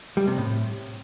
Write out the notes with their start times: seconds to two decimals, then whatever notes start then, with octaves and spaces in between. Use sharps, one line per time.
0.17 G3
0.27 C3
0.38 A2